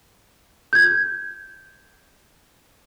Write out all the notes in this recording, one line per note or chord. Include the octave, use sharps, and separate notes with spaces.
G6 G#6